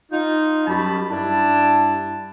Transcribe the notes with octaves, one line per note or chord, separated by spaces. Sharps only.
D#4 F4
F#2 G3 A5 B5
G2 D4 E4 A5